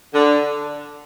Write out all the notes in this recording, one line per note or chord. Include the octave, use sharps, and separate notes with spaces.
D3